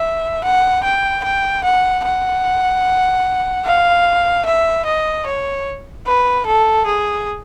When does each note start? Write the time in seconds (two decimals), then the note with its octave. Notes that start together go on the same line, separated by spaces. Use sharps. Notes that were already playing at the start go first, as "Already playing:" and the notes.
Already playing: E5
0.44 F#5
0.84 G5
1.24 G5
1.64 F#5
2.05 F#5
3.66 F5
4.46 E5
4.86 D#5
5.26 C#5
6.07 B4
6.46 A4
6.86 G#4